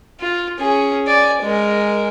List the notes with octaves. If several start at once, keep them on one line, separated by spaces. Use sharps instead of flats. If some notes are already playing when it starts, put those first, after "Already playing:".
F4
C#4 G#4
D5 G#5
G#3 A#4